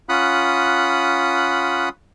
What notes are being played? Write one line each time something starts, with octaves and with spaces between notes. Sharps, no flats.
C#4 F4 F#5 B5 D#6 F#6